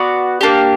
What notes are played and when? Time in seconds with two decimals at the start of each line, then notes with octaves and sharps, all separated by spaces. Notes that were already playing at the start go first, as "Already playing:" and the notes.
Already playing: B3 F#4 D5
0.41 A#3 D4 G4